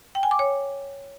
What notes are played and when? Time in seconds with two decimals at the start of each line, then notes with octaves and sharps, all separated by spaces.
0.15 G5
0.23 G#5
0.31 D6
0.39 C#5